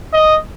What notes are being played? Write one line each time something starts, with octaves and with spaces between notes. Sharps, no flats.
D#5